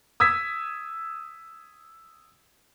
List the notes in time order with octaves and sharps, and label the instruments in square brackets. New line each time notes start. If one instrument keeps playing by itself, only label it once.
[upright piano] D#6 E6 G#6 B6